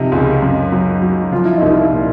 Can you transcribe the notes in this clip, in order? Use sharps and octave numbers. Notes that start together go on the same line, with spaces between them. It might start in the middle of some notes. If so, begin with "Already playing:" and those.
Already playing: C3 F3 D#4
C#2
F#2
F#3
F#3
F3 F4
E4
C2 D#4
E4
A#2